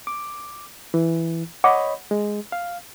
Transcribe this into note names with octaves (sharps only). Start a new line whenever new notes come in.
D6
E3
C#5 D#5 F#5 B5 D6
G#3
F5